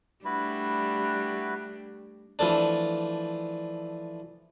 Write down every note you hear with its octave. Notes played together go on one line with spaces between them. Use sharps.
G3 A3 D4 E4 F#4 B4
E3 F3 A3 D4